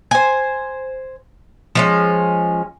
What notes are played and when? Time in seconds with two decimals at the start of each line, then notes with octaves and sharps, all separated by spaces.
0.11 C5 G#5
1.75 F3 G#3 C#4